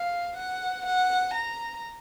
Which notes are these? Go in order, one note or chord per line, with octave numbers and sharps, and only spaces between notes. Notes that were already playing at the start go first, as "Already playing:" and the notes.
Already playing: F5
F#5
F#5
A#5